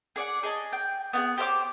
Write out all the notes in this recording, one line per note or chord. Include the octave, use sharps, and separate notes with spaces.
G#4 D5 F#5
G#4 D#5 A5
G5
B3 F4 G#4
G4 C5 E5 D6